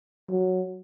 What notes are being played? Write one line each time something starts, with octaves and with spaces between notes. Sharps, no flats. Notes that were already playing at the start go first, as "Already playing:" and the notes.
F#3